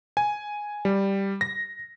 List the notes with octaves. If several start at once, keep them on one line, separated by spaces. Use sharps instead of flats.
G#5
G3
A#6